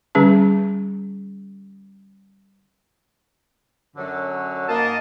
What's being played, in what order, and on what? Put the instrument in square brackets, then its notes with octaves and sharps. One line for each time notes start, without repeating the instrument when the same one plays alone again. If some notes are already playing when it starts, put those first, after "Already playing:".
[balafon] D3 G3 C#4 G#4 A5
[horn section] F#2 D3 F#3
[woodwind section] G#2 D#5 A5 [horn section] A#3